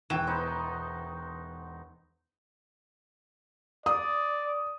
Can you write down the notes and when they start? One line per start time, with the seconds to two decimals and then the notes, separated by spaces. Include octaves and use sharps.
0.10 E1 E3 F#4 G5 E7
0.27 B3 D#4 C5
3.86 D5 D#6